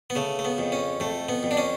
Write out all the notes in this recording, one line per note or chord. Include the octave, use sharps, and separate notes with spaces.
B3
C#3 A3
A3
B3
F2
C#4
F2 A3
B3
F2
D4
C#4